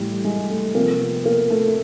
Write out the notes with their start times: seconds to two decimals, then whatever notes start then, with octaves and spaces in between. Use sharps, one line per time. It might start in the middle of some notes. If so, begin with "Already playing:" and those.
Already playing: A2 E3 G3
0.25 G#3
0.50 A3
0.75 C3 F3 A#3
1.00 B3
1.26 A#3
1.50 A3